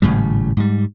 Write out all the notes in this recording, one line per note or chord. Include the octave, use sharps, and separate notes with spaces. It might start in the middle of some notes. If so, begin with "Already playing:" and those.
G#1 A2 C#3 G3
G#2 G3